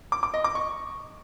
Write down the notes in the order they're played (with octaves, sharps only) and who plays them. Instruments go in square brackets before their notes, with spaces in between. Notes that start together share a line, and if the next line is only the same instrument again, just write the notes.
[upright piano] D6
D6
D#5
D6
C#6